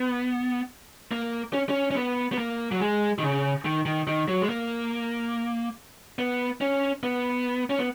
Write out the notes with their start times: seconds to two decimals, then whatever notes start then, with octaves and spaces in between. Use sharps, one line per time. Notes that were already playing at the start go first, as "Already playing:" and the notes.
Already playing: B3
1.11 A#3
1.53 C#4
1.69 C#4
1.91 C#4
1.95 B3
2.32 B3
2.38 A#3
2.72 F#3
2.80 G#3
3.18 D#3
3.23 C#3
3.65 D#3
3.85 D#3
4.07 D#3
4.28 F#3
4.42 G#3
4.49 A#3
6.19 B3
6.61 C#4
7.03 B3
7.70 C#4
7.79 B3